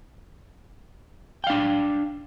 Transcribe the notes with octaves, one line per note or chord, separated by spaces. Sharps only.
D4 F5 G5